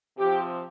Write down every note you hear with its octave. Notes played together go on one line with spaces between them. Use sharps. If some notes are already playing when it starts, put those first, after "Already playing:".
C3 F3 C4 G4